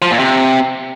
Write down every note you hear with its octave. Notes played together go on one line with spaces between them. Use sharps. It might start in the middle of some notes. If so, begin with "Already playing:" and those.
F3
A#2
C3